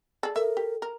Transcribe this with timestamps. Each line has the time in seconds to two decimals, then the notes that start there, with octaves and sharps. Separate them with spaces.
0.23 G#4 A4 D5
0.36 A4 A#4 E5
0.57 G4
0.82 A#4